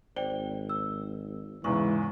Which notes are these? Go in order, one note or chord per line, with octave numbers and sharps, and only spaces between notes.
G#1 C5 D5 G5 G7
E6
E2 G#2 C#3 E3 G#3 C#6